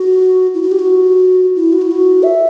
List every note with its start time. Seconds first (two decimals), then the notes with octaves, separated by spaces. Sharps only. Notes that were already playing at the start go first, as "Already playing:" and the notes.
Already playing: F#4
0.54 E4
0.63 F#4
0.71 G4
0.79 F#4
1.56 E4
1.73 F#4
1.82 E4
1.91 F#4
2.23 E5